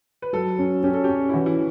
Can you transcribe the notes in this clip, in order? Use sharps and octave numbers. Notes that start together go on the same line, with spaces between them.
B4
F#3 A4
C#4
C#4 G4
A4
C#4 G4
E4
E3 F#4
E4